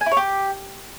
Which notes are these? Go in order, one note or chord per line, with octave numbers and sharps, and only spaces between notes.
G#5
E4
C#5
G4